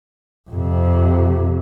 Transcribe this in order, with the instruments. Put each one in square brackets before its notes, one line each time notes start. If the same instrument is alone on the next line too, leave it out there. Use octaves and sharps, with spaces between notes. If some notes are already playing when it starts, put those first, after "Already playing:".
[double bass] F2 C3